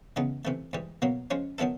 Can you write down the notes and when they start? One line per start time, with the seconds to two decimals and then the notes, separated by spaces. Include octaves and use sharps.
0.16 C#3 E3 G#3 B3 D#4
0.45 C3 E3 A3
0.73 G#2 E3 G3
1.02 B2 F#3 A#3
1.31 F3 G#3 C#4 F4
1.58 D#3 F#3 B3 E4 A4